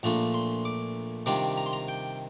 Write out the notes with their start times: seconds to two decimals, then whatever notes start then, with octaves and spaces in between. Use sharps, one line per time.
0.03 A#1 A#2 A3 D4 F4 A#5
0.34 C6
0.65 D6
1.26 C3 D#3 G3 D4 F4 D6
1.57 A#5
1.66 C6
1.73 A#5
1.88 G5